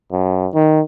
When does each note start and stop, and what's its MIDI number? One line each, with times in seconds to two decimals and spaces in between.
0.12 0.48 42
0.54 0.81 51